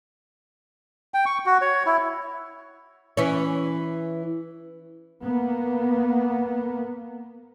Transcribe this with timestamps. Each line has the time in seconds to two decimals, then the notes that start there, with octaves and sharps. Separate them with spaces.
1.14 G5
1.26 C#6
1.46 F#4
1.61 C#5
1.86 E4
3.17 E3 C#4
5.22 A#3 B3